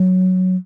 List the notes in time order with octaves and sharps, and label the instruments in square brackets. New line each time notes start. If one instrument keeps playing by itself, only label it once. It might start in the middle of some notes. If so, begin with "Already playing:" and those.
Already playing: [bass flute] F#3